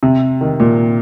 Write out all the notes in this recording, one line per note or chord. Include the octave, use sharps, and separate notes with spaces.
C3
D#3
A#2